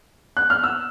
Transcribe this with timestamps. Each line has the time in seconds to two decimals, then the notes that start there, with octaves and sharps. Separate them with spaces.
0.37 F#6
0.50 F6
0.64 E6